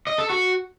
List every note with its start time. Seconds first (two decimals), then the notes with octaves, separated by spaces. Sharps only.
0.07 D#5
0.18 A4
0.30 F#4